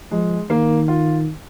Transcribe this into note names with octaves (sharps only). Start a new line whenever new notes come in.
F3 G#3
D#3 A#3
F4